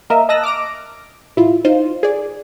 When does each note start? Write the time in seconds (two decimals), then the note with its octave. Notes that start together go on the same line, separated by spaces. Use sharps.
0.10 A#3 A#4 D#5 E5
0.29 D#5 A5 D#6 E6 F#6 A#6
0.43 D6 F6 A#6 D7
1.36 A1 E4 F4
1.65 D#4 F4 C5
2.03 G#4 D5